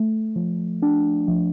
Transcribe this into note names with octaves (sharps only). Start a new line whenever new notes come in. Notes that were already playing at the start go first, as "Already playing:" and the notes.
Already playing: A3
F3
D4
F3